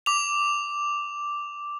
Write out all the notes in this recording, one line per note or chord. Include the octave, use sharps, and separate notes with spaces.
D6 F7